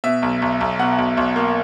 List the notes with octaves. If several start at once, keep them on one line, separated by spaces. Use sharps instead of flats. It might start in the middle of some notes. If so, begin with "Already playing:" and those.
B2 E5
B1
B1
B1
B2 F#5
B1
B1
A#3